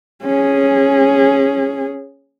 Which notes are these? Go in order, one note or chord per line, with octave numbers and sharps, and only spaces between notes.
C#4 G#4